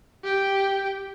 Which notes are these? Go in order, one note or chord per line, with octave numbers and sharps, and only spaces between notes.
G4 G5